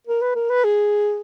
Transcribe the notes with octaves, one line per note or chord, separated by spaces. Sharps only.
A#4
B4
A#4
B4
G#4